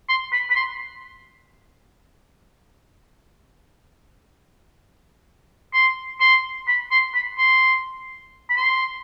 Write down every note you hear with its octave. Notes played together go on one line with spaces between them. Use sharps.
C6
B5
B5
C6
C6
C6
B5
C6
B5
C6
B5
C6